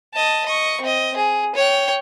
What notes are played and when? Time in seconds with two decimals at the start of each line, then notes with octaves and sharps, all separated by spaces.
0.13 D#5 A5
0.46 D#5 C#6
0.81 C4 D#5
1.16 G#4
1.55 C#5 G5